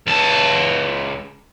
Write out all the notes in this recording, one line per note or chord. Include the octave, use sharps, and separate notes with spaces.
C#2 A5